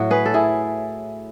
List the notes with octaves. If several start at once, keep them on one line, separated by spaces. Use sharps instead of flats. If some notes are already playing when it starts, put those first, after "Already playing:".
Already playing: A2 F#3 F#4
G#4 B4
A4
E4 G#4